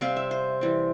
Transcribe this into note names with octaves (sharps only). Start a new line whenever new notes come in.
C3 G3 C4 F5
E5
C5
E3 G3 C4